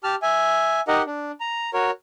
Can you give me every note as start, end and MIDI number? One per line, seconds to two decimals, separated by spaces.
0.04 0.15 67
0.04 0.15 81
0.04 0.15 89
0.22 0.81 76
0.22 0.81 80
0.88 1.03 63
0.88 1.03 67
0.88 1.03 70
0.88 1.03 75
0.88 1.03 78
1.06 1.31 62
1.40 1.70 82
1.73 1.91 66
1.73 1.91 70
1.73 1.91 73